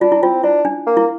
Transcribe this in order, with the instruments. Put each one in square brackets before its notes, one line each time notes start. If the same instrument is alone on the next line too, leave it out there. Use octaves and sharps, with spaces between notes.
[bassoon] D4 [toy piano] F4
[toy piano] E4
[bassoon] C4 [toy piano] F4
[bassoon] D4 [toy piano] E4
[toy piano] D4
[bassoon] A#3
[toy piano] E4